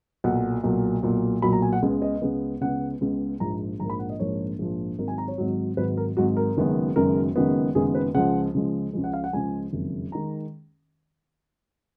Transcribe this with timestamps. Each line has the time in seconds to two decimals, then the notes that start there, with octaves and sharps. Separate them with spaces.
0.24 B1 A#2 F#3 F#5
0.63 B1 A#2 F#3
1.03 B1 A#2 F#3
1.42 B1 A#2 F#3 B5
1.53 A#5
1.62 G#5
1.73 F#5
1.82 C#2 C#3 G#3 B3
2.02 D#5
2.22 C#2 C#3 G#3 B3
2.61 C#2 C#3 G#3 B3 F#5
3.01 C#2 C#3 G#3 B3
3.40 A#1 G#2 F3 A#3 A#5
3.79 A#1 G#2 F3 A#3 A#5
3.90 B5
3.99 F#5
4.10 D#5
4.19 A#1 G#2 F3 A#3 C#5
4.59 A#1 G#2 F3 A#3
4.99 G#1 G#2 F#3 A#4
5.08 G#5
5.18 A#5
5.28 C#5
5.38 G#1 G#2 F#3
5.77 G#1 G#2 F#3 B4
5.97 A#4
6.17 G#1 G#2 F#3 F#4
6.37 A#4
6.57 F#1 F#2 D#3 G#3 B3
6.96 F#1 F#2 D#3 G#3 B3 A#4
7.36 F#1 F#2 D#3 G#3 B3
7.75 F#1 F#2 D#3 G#3 B3 G#4
7.95 B4
8.15 C#2 C#3 F3 G#3 F#5
8.54 C#2 C#3 F3 G#3
8.93 C#2 C#3 F3 G#3
9.04 F#5
9.13 F5
9.24 F#5
9.33 C#2 C#3 F3 G#3 G#5
9.73 F#1 F2 D#3 G#3
10.12 D#3 G#3 A#5